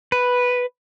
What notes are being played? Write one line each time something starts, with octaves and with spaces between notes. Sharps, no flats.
B4